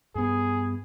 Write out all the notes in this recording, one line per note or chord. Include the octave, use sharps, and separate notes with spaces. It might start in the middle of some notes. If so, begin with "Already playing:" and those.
G2 B3 G#4